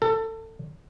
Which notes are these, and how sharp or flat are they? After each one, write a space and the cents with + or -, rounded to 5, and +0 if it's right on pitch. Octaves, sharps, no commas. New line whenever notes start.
A4 +25